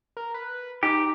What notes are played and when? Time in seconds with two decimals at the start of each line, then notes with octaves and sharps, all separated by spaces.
0.17 A#4
0.34 B4
0.83 D#4 G4